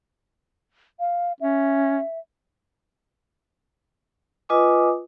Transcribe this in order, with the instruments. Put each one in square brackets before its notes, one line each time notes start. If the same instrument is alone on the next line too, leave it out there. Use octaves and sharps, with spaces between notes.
[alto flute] F5
[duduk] C#4 [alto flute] E5
[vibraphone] F4 B4 D#5 G#5 D6 D#6